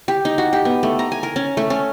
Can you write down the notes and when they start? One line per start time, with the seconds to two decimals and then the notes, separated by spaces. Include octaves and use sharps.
0.08 G4
0.25 D#4
0.38 F#4
0.53 G4
0.65 B3
0.83 A3
0.99 A#5
1.12 G#5
1.23 A#4
1.36 C#4
1.57 A3
1.70 C#4